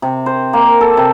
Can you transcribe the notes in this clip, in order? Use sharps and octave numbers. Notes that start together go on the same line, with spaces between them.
C3
C5
A#3
A4
C3